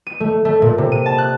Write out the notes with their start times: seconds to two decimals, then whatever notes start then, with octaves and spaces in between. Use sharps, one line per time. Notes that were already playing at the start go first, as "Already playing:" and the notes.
0.07 D#7
0.20 A3
0.45 A3
0.62 A#2
0.78 C3
0.92 D#7
1.06 A5
1.18 F#6